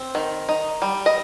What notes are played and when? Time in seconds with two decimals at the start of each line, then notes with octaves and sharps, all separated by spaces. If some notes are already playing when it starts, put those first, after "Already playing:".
Already playing: C4
0.15 D#3
0.49 D#4
0.82 G3
1.06 D#5